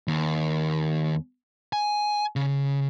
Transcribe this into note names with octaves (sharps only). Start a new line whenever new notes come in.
D#2
G#5
C#3